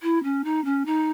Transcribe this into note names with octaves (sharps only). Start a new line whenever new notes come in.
E4
C#4
D#4
C#4
D#4